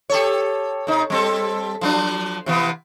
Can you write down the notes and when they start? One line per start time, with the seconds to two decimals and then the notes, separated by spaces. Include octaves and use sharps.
0.10 G4 A4 C#5
0.87 C3 D#4
1.10 G3 C4 A4
1.81 F3 F#3 D4
2.46 C3 E3 B3